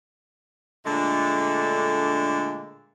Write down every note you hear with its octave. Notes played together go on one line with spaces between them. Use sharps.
A#2 D3 G#3 A3 D4 A4